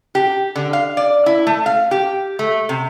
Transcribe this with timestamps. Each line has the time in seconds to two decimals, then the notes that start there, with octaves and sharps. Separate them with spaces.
0.15 G4
0.56 D3
0.73 F5
0.97 D5
1.26 E4
1.47 A3
1.66 F5
1.91 G4
2.39 A3
2.69 C3